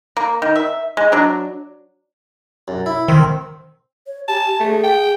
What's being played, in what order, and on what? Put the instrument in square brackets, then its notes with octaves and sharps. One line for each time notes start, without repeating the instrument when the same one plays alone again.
[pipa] A#3
D#3
E5
G#3
F#3 D4
[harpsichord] F#2
E4
[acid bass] D#3 [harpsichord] C4
[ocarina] C#5
[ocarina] G4 [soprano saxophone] A5
[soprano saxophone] A3 [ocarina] G#4
[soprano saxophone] G5